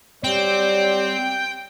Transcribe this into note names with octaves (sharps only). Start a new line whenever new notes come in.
F#3 G3 C4 C#5 D5 G5